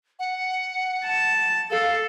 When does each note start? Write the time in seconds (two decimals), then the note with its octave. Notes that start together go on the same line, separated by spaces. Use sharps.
0.19 F#5
1.05 A5
1.71 A4 F5